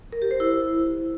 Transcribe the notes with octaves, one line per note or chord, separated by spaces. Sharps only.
A#4
G4
C5
E4